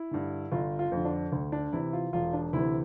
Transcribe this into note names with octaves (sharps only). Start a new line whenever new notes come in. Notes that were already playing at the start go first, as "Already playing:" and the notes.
Already playing: E4
G2 D3
G1 F4
F4
F2 D3
D4
D2
D4
C3 E3 E4
F4
E1 F4
D4
D2 C3 E3 E4